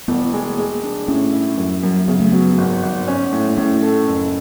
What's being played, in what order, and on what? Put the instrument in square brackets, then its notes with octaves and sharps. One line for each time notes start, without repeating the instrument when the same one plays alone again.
[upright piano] E1 [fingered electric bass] B3
[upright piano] G#3
G#3
D4
[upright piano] A2 [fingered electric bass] C#4
[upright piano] E4
F#2
F#2
[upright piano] C#3 [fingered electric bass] B3
[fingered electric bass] A3
[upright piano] F#3 [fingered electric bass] B3
[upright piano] G#1
G#1
C#4
A2
[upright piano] A2 [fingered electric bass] C#4
[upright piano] A4
F#1